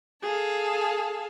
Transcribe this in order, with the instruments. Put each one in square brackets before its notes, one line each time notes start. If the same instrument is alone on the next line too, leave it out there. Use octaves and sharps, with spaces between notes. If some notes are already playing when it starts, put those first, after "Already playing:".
[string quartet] G#4 A4 F5